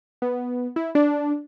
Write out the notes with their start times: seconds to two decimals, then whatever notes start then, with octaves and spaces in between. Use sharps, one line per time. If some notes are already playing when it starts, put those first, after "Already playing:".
0.22 B3
0.76 E4
0.95 D4